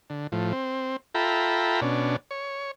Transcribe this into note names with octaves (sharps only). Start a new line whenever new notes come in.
D3
A2 F3
C4
F4 A4 E5 G5 A#5 B5
B2 C#4 D4
C#5